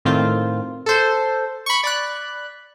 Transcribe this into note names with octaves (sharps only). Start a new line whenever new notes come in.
A2 D#3 C4 F4
A4 C5
B5 C#6
D5 B5 F#6